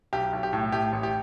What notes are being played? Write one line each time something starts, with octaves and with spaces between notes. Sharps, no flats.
B1 G4
B1
G4
A2
A3 G4
A1
G4